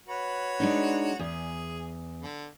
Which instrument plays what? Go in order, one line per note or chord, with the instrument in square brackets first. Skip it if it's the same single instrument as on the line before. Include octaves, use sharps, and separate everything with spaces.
[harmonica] F#4 B4 C#5
[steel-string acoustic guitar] G#3 D4 D#4
[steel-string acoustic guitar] E2 [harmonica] G#4
[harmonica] D3